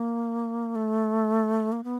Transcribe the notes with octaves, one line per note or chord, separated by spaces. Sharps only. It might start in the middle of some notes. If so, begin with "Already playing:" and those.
Already playing: A#3
A3
A#3
B3